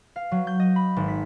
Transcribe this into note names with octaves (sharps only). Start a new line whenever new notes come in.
F5
F#3
G6
D#5
B5
G#1
B6